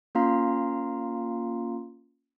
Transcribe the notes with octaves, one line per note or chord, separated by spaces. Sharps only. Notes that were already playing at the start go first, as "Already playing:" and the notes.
A#3 C#4 F4 F5 A#5 C6